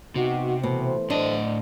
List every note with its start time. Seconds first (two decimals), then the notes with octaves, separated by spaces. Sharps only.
0.16 C3 B3 D#4 F#4
0.63 B2 E3 A3 C5
1.10 A2 D4 D#5